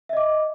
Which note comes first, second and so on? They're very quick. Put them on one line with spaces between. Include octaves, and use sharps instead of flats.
E5 D#5 D6